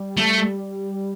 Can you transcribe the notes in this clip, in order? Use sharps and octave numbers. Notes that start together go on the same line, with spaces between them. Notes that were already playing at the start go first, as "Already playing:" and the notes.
Already playing: G3
A3